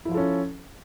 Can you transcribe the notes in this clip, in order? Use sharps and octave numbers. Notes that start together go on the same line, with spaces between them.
F3 C#4 E4 F4 A4